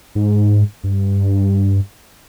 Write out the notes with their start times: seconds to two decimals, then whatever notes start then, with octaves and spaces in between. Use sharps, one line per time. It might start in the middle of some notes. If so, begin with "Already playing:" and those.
0.15 G#2
0.84 G2